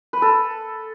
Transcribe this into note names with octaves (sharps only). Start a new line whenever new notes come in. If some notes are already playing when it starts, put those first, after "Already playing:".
B4
A4